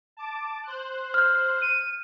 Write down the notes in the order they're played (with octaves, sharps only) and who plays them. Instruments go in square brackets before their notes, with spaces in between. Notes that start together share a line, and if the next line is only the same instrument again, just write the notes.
[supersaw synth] A5 D6
C5 F#6
[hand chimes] F6 G6
[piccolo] D#7